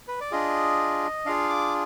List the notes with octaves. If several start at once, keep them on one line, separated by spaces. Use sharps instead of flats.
B4
D5
D4 F4 G#4 D#5
D4 F4 G#4 F5
D6